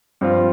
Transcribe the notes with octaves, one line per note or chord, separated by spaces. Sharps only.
G2 F3 C4 F4